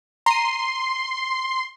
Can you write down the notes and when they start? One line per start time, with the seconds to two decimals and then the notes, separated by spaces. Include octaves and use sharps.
0.26 A#5 C6 D#7